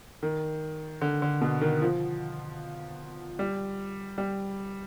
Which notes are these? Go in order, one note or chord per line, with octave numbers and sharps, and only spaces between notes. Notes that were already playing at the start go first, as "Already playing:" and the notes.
D#3
D3
D3
B2
D#3
F3
G3
G3